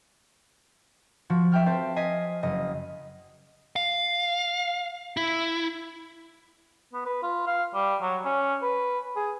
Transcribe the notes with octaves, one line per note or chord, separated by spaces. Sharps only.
F3 F#4
E5 G5 F6
C4 A4 C5 E5
D#5 G#5 B6 C7
F#1 D#5
F5
E4
B3
B4
F4
F5
G3
F#3
C#4
B4
G#4